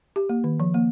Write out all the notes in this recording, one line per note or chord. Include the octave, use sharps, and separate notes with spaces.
G4
A#3
D#3
F3
A#3